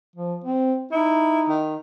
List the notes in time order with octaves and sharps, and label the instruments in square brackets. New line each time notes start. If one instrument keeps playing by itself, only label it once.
[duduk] F3
C4
[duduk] D#4 [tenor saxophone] E4
[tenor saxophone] D#3